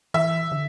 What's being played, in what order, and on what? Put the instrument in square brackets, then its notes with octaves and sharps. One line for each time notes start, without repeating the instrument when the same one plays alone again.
[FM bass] E3 [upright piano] E5
[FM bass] D3